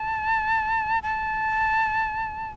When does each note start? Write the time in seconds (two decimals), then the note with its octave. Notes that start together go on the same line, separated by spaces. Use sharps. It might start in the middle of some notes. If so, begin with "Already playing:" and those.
Already playing: A5
1.03 A5